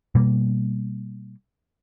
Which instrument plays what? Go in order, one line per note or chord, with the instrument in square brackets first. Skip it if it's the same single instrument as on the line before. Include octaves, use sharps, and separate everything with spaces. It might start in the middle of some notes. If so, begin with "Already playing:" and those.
[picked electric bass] B2 G3 A#3